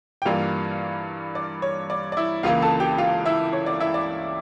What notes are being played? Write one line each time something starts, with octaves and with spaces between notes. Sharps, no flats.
G5
G2 E3 G3 A#3 F4 F5
D5
C#5
D5
D5
E4 E5
C#2 C#3 E3 A#3 F4 F5
A4 A5
G4 G5
F4 F5
E4 E5
C#5
D5
E4 E5
D5